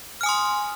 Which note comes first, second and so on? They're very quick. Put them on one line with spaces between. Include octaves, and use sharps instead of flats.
F6 G#5 D#6 C6